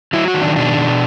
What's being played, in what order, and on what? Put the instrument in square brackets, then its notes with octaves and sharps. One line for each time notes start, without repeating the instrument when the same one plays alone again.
[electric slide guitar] F#3 E4
F#4
D#3
D4
B2 D4
B2